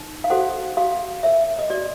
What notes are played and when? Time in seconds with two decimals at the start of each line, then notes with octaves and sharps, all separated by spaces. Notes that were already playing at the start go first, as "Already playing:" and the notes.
Already playing: D#4
0.24 F5
0.30 F#4 A4 C5 F#5
0.77 F#4 F5
1.23 A#4 C#5 E5
1.59 D#5
1.70 F#4 D5